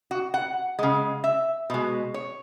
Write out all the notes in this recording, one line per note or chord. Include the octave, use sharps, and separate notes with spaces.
F#4
F#5
C#3 G#3
E5
B2 G#3
C#5